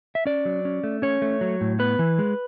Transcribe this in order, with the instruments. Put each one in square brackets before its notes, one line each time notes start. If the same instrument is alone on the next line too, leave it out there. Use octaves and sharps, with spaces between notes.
[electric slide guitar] E5
C#4 D5
F#3
C#4
A3
C#4 C#5
A3
F#3
A2
B3 B4
E3
G#3